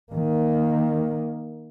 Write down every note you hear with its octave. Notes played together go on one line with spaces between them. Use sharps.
D#3 A#3